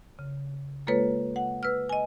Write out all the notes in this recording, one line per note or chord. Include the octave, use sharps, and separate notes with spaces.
C#3
G#3 A#3 F4 A4 B4 C#5
F#5
B4 E6 F6
D#5 G#5